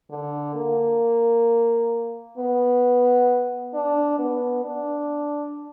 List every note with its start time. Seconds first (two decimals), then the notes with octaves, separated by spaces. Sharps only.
0.10 D3
0.55 A#3
2.37 B3
3.74 D4
4.18 B3
4.64 D4